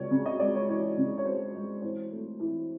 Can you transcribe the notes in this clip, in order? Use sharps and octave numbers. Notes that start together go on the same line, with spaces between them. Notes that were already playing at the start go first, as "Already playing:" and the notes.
Already playing: C#2 C#5 D5
C#3
D#5
G#3 D5
C#5
E3 C#5
C#3
C#5
G#3 C5
G#3
E3 C5
A3
E3